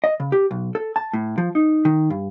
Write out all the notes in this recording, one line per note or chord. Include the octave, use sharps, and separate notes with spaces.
D#5
C#3
G4
B1
A4
A5
A2
F3
D#4
D#3
G2